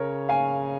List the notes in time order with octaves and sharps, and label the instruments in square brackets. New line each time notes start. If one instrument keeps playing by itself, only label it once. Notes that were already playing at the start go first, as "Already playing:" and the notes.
Already playing: [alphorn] C#3 [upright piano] A#4 C#5
[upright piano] F5 G#5